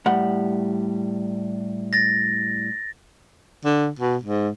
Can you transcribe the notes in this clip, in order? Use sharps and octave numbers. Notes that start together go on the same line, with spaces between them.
A2 G3 F#5
A6 A#6
D3
B2
G#2